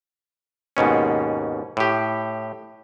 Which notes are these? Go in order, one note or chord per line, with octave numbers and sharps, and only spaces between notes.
D#2 G#2 B2 C#4
A2 G4